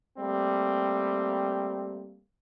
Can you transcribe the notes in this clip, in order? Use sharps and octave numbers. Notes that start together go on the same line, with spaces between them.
G3 A3 A#3 C4